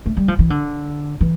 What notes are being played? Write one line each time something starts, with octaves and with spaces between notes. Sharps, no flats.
A3
G3
F3
E3
D3
E3